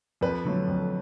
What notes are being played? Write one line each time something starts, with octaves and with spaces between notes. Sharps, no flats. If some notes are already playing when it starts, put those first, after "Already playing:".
F2 B4
D3 F#3 A3
F2